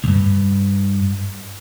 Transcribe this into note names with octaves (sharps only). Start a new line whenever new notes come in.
C#2 G2